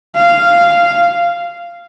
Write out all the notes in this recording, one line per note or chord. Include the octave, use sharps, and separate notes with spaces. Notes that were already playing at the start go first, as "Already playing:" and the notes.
F5